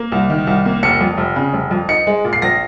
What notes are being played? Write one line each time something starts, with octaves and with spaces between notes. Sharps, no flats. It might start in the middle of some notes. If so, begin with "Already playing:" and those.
Already playing: A#3
C2
D#3
C2
A#3
F1 C#7
F2
F1
C#3
F1
F2
D#4 C#7
G#3
A#2
C7
A#1 A#6